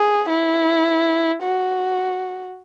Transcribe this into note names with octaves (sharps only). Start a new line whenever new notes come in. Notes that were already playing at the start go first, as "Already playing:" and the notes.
Already playing: G#4
E4
F#4